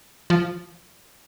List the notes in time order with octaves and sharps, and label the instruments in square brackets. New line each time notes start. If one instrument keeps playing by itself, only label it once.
[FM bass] F3